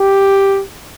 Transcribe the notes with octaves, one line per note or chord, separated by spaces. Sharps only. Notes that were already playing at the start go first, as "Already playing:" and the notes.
Already playing: G4